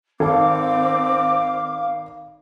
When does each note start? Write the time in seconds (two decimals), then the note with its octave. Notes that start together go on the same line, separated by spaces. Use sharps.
0.20 G#1 C4 A4 F5 D6